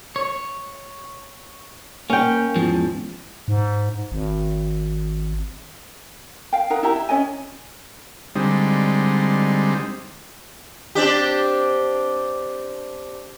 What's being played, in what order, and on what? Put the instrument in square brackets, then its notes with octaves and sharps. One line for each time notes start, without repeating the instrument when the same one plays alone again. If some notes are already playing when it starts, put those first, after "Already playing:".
[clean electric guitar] C#5
[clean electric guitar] A#3 [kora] C#4 G5
[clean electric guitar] E2 G#2 F3
[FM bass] G#2
G#1
[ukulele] F5 G5
D#4 A#4 F#5 A#5
E4 G4 A#5
E5
C#4 C#5 D#5 G#5
[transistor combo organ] D3 G3 G#3 C4 D#4
[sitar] C4 D4 G4